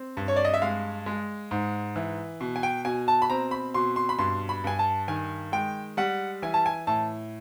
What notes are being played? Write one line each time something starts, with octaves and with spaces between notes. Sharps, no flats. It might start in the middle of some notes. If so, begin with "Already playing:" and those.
Already playing: C4
G2
C#5
D5
D#5
E5
G#3 F5
G#3
G#2
E3
B2
G#5
G5
B2 G#5
A5
B5
C4 A#5
B5
B2 C6
C6
B5
G2 C6
B5
G2 G#5
A5
D#3 G#5
G#3 G5
G3 F#5
E3 G#5
A5
G#5
A2 A5